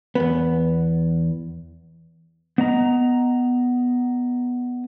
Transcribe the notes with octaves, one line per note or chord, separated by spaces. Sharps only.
E2 B3
B3 D#5 A#5